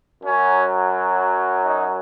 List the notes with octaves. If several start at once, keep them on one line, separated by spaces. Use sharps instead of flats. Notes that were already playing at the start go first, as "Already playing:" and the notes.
F#2 F#3 C#4
D#4